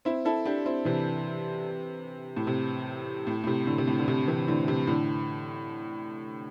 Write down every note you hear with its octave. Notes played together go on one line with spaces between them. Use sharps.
C4 E4
E4 A4
D4 G4
C4 E4
C3 E3
A2
C3
A2
A2
C3
A2 D3
C3
A2
D3
C3
C3 E3
A2 D3
C3
A2 D3